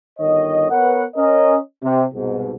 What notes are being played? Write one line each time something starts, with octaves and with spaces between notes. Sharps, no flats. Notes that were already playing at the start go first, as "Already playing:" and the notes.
G1 D#3 C#5 D#5
B3 A#4 B4 C#5 F#5
C#4 A#4 D#5
C3
C2 G#2 B2